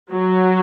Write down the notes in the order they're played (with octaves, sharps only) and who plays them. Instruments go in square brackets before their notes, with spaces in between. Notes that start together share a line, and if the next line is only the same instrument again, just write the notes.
[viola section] F#3